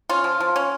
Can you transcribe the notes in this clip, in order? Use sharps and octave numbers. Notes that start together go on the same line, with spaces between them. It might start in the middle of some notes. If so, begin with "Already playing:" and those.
C#4 F4
F3
F3
C#4